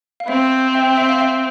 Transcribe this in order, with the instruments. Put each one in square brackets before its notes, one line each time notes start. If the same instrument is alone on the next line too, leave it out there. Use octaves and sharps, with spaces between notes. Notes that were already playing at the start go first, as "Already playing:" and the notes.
[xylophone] F5
[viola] C4 [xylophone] E5
[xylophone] E5 G5
E5
F5
E5